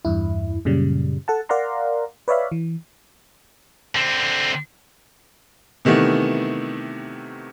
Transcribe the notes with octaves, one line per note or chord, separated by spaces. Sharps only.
E2 G2 E4
F#2 A#2 C#3 G3
A4 F#5 A5
A#4 D5 F5 F#5 A#5 C6
B4 C#5 D5 E5 F5 B5
E3
D3 C4
C3 D#3 E3 A3 B3